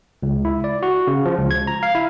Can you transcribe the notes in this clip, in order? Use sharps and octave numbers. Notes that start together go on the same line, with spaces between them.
C#2
E4
D5
F#4
C#3
F3
C#2
G#6
A#5
F5
E4